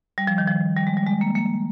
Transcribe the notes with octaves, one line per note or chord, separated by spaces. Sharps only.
G3
F3
D#3
F3
G3
G#3
G3
G#3
A#3
A#3